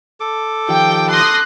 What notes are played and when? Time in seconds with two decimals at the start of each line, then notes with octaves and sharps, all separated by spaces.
0.20 A4 D6
0.68 D#3 F3 G4 G5
1.11 C6 D#6 F#6 A#6